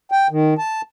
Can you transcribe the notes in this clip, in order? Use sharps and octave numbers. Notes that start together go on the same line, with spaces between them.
G5
D#3
A5